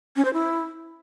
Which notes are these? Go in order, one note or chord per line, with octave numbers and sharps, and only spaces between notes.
C#4
C5
E4